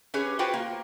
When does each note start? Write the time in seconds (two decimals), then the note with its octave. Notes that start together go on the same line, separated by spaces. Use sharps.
0.14 C#4 G4 G#4 B4 C#5
0.39 F4 F#4 B4 C5 G5
0.54 A#3